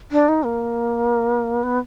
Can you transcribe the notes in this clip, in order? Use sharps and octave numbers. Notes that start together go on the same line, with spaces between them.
D4
D#4
A#3
B3